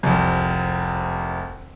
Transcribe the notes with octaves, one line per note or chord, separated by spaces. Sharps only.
F1 C2